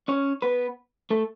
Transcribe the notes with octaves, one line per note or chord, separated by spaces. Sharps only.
C#4 C#5
B3 B4
A3 A4